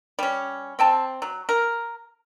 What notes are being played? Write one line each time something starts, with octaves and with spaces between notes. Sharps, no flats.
G3 C#4
C4 G5 A5
F#3
A#4